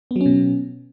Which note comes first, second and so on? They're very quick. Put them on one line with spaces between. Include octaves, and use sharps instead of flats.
B3 F#3 C#4 B2